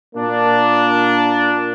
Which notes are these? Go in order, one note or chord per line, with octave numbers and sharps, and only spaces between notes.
A#2 A#3 D4